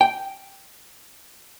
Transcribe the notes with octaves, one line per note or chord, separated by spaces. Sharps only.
G5